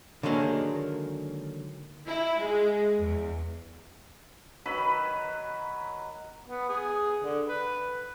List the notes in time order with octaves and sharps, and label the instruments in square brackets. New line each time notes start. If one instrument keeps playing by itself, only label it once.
[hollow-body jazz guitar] D3 D#3 F#3 G#3 A#3
[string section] E4
G#3
E2
[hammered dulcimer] D#3 F#3 B4 B5
[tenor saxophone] B3
G#4
D3
B4